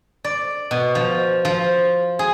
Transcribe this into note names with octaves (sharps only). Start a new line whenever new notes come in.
D5
B2
F3
F3
G#4